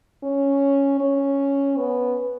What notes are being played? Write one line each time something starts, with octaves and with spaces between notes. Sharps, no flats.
C#4
C#4
B3